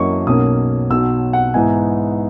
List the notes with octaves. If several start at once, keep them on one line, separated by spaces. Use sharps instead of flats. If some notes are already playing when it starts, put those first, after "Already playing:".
Already playing: F#2 E3 A#3 C#4 D#5 C#6
B1 B2 A#3 C#4 D#6
B1 B2 F#3 E6
F#5
G#2 E3 B3 D#4 G#5